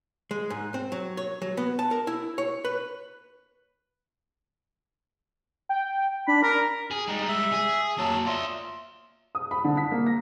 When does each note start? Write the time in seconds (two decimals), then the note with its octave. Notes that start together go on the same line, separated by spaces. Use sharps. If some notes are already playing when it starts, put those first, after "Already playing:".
0.31 G#3
0.50 G#2
0.74 C4
0.92 F#3
1.17 C#5
1.42 F#3
1.57 B3
1.79 A5
1.91 A#4
2.07 E4
2.38 C#5
2.65 B4
5.69 G5
6.28 D4 B5
6.43 A#4 A#5
6.91 G#4
7.08 G3 G#3 D#4
7.28 E5
7.52 G#4
7.98 F#3 A#3 C#5 A5
8.26 F4 D5 E5
9.35 D#6
9.51 B5
9.65 D3
9.77 B6
9.92 A#3
10.06 A#6